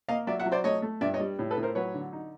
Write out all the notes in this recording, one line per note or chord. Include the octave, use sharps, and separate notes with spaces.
A#3 D#5 F5
F#3 D5 E5
E5 F#5
F#3
C5 D5
A3 C#5 D#5
A3
G2 D5 E5
C#5 D#5
G3
A2
A4 B4
A2
A#4 C5
F#3 B4 C#5
D3
D#4